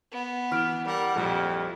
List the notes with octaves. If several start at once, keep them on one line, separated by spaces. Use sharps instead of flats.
B3
E3 F6 D7
G3 A#4 F#5
A#1 F2 G3 E4